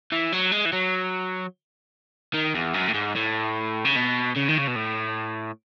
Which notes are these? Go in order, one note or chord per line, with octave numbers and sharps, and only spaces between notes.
E3
F#3
G#3
E3
F#3
D#3
E2
F#2
A2
G#2
A2
C#3
B2
C#3
D#3
C#3
B2
A2